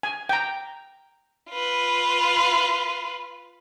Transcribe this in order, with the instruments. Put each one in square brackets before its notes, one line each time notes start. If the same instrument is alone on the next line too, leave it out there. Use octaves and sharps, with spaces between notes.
[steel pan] G#5
G5 A#5
[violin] F4 B4